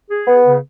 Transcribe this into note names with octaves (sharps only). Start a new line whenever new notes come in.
G#4
B3
C#3